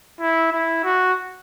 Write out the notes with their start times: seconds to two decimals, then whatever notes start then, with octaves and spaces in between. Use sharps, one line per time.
0.20 E4
0.52 E4
0.84 F#4